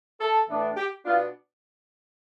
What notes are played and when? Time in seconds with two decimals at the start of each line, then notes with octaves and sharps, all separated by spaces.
0.20 A4
0.48 A2 E3 B3 D4
0.77 G4
1.05 B2 B3 D4 F4